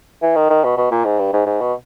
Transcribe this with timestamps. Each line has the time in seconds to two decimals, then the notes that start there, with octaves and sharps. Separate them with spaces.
0.22 E3
0.36 D#3
0.50 D#3
0.64 B2
0.77 B2
0.91 A#2
1.05 G#2
1.19 G2
1.33 G#2
1.46 G#2
1.61 B2